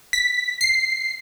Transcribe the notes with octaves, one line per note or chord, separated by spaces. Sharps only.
B6
C7